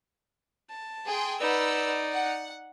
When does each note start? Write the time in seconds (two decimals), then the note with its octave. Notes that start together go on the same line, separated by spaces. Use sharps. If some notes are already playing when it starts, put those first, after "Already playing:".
0.69 A5
1.06 G#4 G5 C6
1.40 D#4 B4 D5 F#5 E6
2.11 F#5